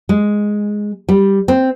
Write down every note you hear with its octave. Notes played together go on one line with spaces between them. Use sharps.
G#3
G3
C4